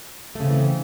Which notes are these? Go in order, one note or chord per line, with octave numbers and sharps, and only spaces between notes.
C#3 E3 A3 C4